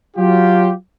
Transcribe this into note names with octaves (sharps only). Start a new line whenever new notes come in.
F#3 F4 G4